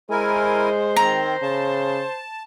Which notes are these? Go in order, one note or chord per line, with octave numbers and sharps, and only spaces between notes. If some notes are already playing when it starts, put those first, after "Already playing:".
G#3 E4 A#4 C5 G#5
D#3 C4 A#5
C#3 A5